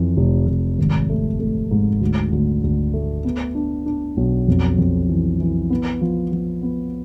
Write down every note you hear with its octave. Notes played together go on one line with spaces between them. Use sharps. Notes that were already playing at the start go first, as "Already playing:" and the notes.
Already playing: F2 E3
F1
F1
G#1
A3
A3
G#2
D2
D2
D2
A3
B3
D4
D4
B1
F2
F2
E3
E3
B3
F3
F3
B3